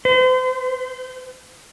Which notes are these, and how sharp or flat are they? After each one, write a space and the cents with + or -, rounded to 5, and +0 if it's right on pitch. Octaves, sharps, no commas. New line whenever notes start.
C5 -35